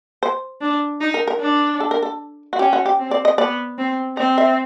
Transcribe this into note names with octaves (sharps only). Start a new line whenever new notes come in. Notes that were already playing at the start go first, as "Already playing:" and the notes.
C5
D4
D#4
A#4
A#4
D4
A4
A#4
A4
F#4
C#4 G4
F#4
G4
C4
D5
D#5
B3 D5
C4
C4 D#5
E5